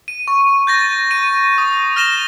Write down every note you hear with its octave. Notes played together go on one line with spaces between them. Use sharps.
D#7
C#6
G6 A6 A#6
D#7
D#6
F6 A#6 E7 G7